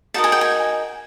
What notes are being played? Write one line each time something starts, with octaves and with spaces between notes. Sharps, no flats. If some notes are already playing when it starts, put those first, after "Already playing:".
D#4 F#4 A#4 D#5 A5
G#5
G5
G#5